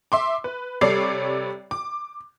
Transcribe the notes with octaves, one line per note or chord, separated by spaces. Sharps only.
E5 C6 D6
B4
C3 G3 A4 C#5 D5 C7
D6